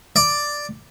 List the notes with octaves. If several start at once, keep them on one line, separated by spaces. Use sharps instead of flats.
D5